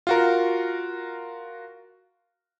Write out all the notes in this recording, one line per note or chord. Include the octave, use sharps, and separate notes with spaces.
F4 F#4 A#4